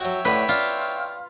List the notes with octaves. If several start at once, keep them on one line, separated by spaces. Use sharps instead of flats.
F#3 F#4 C#5 E5 G5
A2 D3 B4
D4 F4